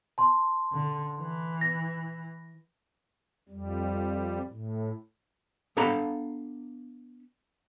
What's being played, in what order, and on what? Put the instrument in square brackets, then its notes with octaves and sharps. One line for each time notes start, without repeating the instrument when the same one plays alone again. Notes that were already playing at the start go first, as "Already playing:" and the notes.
[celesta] A5 C6
[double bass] D3
E3
[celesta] A#6
[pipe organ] F2 G3
A2
[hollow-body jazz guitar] B3 D4 A4 F5 A#5 B5